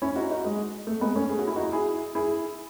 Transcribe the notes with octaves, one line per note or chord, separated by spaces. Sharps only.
C#4 E4
D#4 F#4
D#4 F#4
G#3
A3
G#3 B3
A3 C#4
G#4
F#4
E4
D#4 F#4
E4 G#4
E4 G#4